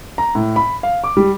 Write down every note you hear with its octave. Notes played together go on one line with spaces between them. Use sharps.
A#5
A2
B5
F5
D6
G3